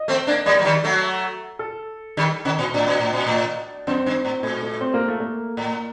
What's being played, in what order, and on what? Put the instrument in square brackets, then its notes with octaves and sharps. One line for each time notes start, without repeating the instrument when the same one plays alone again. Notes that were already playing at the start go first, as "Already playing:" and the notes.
Already playing: [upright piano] D#5
[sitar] A3 C4
A#3 D4
[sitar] G3 A#3 [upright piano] D5
[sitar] F#3
D#3 G3
F#3 A3
[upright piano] A4
[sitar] D#3 G3
C3 D#3
A#2
[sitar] A2 [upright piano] D4
[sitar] A#2
A2
A#2
A2
[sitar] F#2 [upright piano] C4
[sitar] G2
A2
[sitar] A#2 [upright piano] A3
[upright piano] A3
C4
A#3
A3
A#3
[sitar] A2